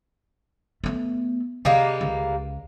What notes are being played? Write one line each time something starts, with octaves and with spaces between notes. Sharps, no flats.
A3 B3
C3 G3 G#3 A#3
C#2